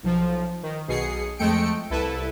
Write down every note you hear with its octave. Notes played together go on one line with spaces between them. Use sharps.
B1 F3
D#3
B1 B2 G#4 C7 C#7
F2 G#3 A3 G5 C#7 D7
C2 E4 A4 B4